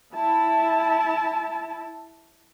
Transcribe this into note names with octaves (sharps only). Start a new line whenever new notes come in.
E4 A5